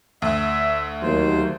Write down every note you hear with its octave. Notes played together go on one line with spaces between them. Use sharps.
D2 E5
D#2 F#3 C5